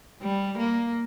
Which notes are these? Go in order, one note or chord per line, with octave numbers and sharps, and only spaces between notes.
G3
A#3